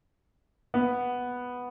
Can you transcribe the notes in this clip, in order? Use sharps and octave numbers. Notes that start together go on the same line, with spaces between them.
B3